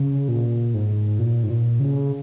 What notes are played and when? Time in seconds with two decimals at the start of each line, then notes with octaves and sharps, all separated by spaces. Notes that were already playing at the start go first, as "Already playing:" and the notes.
Already playing: C#3
0.28 A#2
0.74 G#2
1.19 A#2
1.43 G#2
1.50 A#2
1.80 C#3